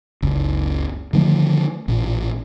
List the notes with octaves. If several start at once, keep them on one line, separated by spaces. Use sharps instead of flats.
F#1 C#2
D3 D#3 F3 A3
A1 A#2